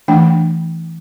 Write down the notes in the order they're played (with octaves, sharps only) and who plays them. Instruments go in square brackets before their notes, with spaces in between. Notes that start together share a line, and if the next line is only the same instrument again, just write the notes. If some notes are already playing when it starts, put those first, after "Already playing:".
[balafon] E3 A3 D4 G5